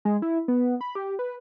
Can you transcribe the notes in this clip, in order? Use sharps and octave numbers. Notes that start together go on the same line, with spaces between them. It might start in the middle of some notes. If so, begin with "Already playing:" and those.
G#3
E4
B3
B5
G4
B4